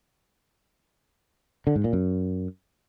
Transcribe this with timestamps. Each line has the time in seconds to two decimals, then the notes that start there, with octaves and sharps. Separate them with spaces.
1.67 D3
1.75 G#2
1.84 A#2
1.93 F#2